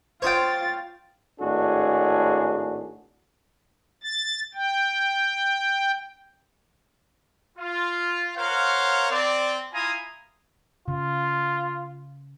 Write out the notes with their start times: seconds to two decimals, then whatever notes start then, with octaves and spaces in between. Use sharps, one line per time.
0.22 F4 C5 C#5 G5 D#6 A6
1.41 G#1 A2 D4 F#4 G#4
4.03 A6
4.54 G5
7.58 F4
8.37 A#4 C5 C#5 F5 F#5
9.11 C4 D5
9.73 E4 F4 G#5 A#5 C6 D#6
10.88 C#3 F4